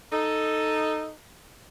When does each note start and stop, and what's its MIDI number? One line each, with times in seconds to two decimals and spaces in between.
0.12 1.10 63
0.12 1.10 69